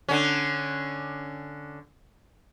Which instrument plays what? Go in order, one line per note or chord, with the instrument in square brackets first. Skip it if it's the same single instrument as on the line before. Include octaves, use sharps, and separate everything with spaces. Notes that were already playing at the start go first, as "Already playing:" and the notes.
[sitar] D3 C#4